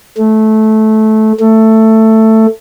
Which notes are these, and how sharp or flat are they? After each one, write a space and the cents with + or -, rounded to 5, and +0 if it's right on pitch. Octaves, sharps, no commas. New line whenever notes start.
A3 -15
A3 +10